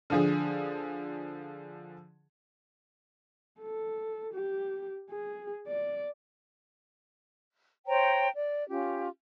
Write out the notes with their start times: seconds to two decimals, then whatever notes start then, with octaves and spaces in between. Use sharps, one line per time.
0.10 D3 F3 G#4
3.61 A4
4.34 G4
5.10 G#4
5.67 D5
7.86 C5 C#5 G5 A#5
8.34 D5
8.69 C#4 F4 G4